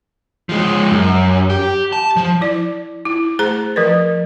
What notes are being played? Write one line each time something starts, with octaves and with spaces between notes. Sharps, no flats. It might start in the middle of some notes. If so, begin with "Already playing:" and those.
F3 G#3
F#2
G4
A5
F3
E4 D5
E4
A3 G#4 C5 A#5
F3 A#4 B4